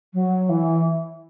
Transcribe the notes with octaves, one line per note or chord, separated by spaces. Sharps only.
F#3
E3